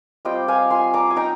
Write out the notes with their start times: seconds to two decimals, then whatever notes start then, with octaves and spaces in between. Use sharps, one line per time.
0.25 G3 C4 F4 D#5 G5
0.48 F5 G#5
0.70 G#5 C6
0.94 A#5 D6
1.10 G#5
1.16 D#4 G5 A#5